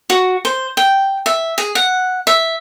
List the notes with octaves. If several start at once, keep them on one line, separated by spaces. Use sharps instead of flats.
F#4
C5
G5
E5
G#4
F#5
E5